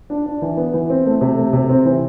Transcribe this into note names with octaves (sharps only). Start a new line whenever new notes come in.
D4
D4
E3
B3
E3
C4
A3
C3
A3
C3
C4
E3